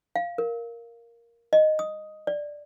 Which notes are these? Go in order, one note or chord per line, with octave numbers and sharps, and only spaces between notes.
F5
A#4
D#5
D#6
D5